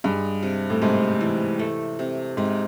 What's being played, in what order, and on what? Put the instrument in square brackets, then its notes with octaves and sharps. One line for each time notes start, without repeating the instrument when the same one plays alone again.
[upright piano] G2 [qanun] G#3
[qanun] C3
[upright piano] A2
[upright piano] G#2 [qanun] C3
[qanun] E3
A3
C3
[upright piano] G#2 [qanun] C3